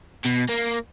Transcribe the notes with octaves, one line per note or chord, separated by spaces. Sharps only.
B2
A#3